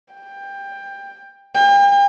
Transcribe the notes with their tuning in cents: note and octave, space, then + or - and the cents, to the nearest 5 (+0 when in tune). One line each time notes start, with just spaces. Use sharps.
G5 +15
G5 +40